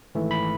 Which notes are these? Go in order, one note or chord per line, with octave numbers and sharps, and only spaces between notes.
G#1 G#2 E3 A3
B5